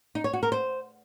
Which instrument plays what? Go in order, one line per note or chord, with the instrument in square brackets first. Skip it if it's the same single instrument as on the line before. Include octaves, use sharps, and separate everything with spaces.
[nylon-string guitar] D#4
C#5
F#4
A#4
C5